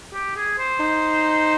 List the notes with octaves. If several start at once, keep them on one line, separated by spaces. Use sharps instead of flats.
G4
G#4
C5
D#4